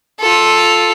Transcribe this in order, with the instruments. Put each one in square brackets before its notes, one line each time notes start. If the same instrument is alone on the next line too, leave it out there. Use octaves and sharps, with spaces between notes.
[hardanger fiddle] F4 A4